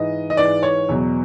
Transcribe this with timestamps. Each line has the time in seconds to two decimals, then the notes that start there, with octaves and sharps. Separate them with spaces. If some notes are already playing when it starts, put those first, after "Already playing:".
Already playing: G#2 E3 D#5
0.30 D#5
0.37 G#2 E3 D5
0.63 C#5
0.89 E2 B2 F#3